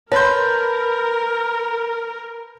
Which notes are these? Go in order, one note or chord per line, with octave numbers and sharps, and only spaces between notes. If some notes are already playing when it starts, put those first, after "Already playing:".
A#4 B4 C#5 A5 B5 C6 G6